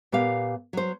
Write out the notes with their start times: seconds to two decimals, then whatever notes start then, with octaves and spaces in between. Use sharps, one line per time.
0.12 A#2 B3 G4 F5
0.73 F#3 C5